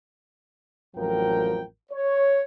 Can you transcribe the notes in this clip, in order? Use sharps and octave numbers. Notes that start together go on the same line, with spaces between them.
A1 F2 F3 F#3 A#4 G5
C#5